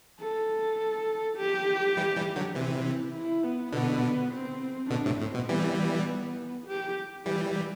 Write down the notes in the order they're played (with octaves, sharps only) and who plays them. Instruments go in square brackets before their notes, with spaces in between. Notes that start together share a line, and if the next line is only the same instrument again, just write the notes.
[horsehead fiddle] A4
G4
[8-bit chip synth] E3 G3
E3 G3
D3 F#3
[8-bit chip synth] C3 E3 [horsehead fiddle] C4
[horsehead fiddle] E4
E4
B3
[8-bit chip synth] B2 D3 [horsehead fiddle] B3
[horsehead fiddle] C4
[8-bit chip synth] B2 D3 [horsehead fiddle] D4
[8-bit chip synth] A2 C3
[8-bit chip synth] A2 [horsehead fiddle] C4
[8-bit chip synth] B2
[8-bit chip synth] E3 G3 [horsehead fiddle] B3
[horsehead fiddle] G4
[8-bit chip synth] E3 G3 [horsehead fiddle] G4